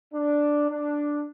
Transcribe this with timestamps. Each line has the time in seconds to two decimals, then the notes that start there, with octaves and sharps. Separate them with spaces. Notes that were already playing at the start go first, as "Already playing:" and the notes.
0.14 D4
0.70 D4